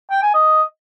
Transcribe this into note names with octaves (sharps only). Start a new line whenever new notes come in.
G5
G#5
D#5